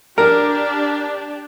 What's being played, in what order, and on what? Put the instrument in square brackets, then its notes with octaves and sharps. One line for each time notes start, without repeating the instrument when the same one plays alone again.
[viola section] D4 G4 [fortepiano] A#4